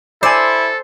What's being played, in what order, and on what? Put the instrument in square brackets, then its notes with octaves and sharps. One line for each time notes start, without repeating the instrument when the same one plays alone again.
[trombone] E4 [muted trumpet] A4 [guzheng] C5 [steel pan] D5 G#5